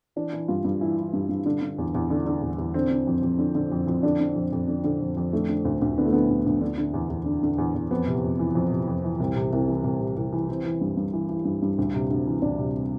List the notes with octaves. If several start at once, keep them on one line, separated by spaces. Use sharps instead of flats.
E3 D4
E3
G2 F4
G2
E3 E4
E3
G2
G2
D3
D3
E2
E2
D3
D3
E2
E2
D3 C4
D3
F2
F2
D3
D3
F2
F2
D3 D4
D3
F2
F2
D3
D3
F2
F2
D3 A3
D3
D2
D2
D3 B3
A3
D3 B3
D2
D2
D3
D3
E2
E2
D3
D3
E2
E2
F2 B3
C3
F2
E3
F2
C3
F2
E3
C2
C3
C2
E3
C2
C3
C2
E3
E3 C4
E3
G2
G2
E3
E3
G2
G2
D2
C3
D2
E3
D2 D4
C3